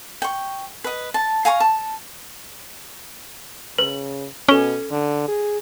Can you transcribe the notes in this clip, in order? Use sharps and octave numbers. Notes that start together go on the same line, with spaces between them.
G5 C#6
B4 D#5
A5
F5 G#5 A#5 C#6
A5
C#3 B4
B2 C#4 A4 G7
D3
G#4